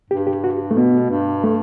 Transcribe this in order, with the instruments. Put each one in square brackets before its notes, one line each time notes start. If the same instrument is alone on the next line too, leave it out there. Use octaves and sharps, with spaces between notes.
[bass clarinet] G2 [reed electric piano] G4
[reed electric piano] G4
F#4
A3
[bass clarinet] B2 [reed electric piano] B3
[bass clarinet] G2
[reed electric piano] A3